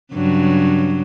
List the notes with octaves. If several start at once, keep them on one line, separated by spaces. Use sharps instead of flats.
G2 C#3 F#3